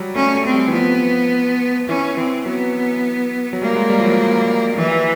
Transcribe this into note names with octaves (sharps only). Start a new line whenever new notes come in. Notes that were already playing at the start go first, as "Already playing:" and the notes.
Already playing: F#3 G3
A3 C#4
A3
C4
G3
E3
F3 B3
E3 C#4
E3 C4
F#3 B3
F#3
G3 A#3
G#3
G3
F3
F#3
E3